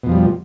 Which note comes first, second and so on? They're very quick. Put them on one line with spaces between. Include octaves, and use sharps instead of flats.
B2 F2 F3 G3